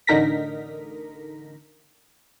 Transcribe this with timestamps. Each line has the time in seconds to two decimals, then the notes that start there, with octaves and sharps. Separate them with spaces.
0.07 A1 D3 D#4 A#4 A#6 B6